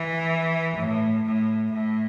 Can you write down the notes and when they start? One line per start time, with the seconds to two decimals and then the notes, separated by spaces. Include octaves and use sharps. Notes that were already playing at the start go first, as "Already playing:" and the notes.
Already playing: E3
0.77 A2
1.25 A2
1.73 A2